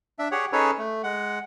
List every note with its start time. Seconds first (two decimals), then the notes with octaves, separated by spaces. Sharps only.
0.19 D4 E5
0.32 G4 G#4 C#5 F#5
0.52 C#4 D#4 G#4 A4 B4 C#5
0.78 A3
1.03 G#3 F#5